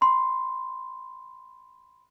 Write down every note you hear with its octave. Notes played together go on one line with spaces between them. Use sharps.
B5 C6